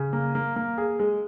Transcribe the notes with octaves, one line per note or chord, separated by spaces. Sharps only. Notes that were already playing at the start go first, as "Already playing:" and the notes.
Already playing: C#3
A#3
A#3
A#3
G#4
G#3